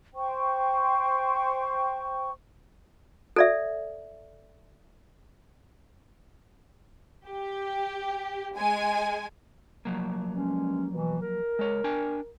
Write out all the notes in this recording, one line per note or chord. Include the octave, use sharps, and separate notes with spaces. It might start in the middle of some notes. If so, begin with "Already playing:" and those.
C5 G5 C#6
A4 D5 E5
G4
G#3 G#5
F3 F#3 A#3
G2 G#3 C#4
B2 E3
A#4
G#3 C#5
D4 G5 G#5